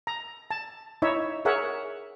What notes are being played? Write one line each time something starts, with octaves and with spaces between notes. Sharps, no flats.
A#5
A5
D#4 E4 C#5 E5
G#4 A#4 C#5 E5 F#5